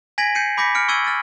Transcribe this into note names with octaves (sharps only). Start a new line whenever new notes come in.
G#5 G#6 A#6 B6 D7 F#7
G6 C7 C#7 D#7
B5 D6 G6 A#6 B6 C#7
F6 C#7 D7
C#6 E6 G#6 D#7 F#7
F6 A6 C#7 D#7